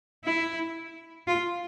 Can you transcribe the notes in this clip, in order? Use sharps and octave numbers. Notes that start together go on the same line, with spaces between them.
E4
F4